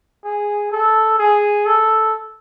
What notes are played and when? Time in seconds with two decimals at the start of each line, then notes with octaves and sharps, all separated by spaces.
0.24 G#4
0.72 A4
1.18 G#4
1.66 A4